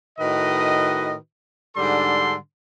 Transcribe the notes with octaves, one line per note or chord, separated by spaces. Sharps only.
A2 D#3 F#4 B4 D#5
G#2 D3 G3 D4 A4 C6